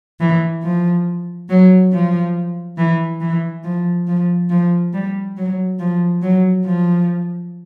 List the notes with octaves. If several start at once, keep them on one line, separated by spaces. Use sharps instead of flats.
E3
F3
F#3
F3
E3
E3
F3
F3
F3
G3
F#3
F3
F#3
F3